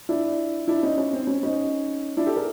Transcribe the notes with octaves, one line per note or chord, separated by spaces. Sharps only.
D4 E4
D4 E4
C#4 D#4
C#4
C4
C#4
C#4 D#4
D4 E4
G4 A4
G#4 A#4